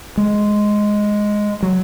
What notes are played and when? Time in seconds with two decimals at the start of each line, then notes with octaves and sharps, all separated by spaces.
0.17 G#3
1.63 F#3